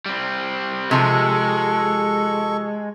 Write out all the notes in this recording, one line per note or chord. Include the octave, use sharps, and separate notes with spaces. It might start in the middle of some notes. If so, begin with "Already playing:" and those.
G3 C4
C3 F3 G#3 A4 C#6